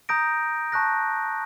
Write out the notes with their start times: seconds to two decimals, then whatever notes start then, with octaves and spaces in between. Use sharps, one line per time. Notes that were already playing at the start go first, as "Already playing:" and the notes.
0.09 A#5 D#6 G6 A#6 D7
0.72 A5 C#6 F#6 A#6